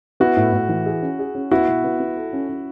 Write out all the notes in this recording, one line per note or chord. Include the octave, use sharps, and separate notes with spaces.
B3 E4 F#4
A2
A2
E3
G#4
C#4
G#4
C#4
B3 E4 F#4
B2
B3
B3
A4
C#4
C#4